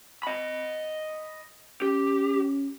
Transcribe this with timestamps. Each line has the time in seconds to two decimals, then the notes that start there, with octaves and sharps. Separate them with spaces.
0.23 D#5 B5
1.82 C#4 G4